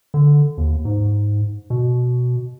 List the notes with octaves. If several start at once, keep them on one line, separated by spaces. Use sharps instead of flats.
D3
D#2
G#2
B2